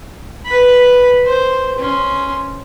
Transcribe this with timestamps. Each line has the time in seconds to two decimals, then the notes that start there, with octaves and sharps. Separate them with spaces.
0.45 B4 B5
1.26 C5
1.78 C#4 C6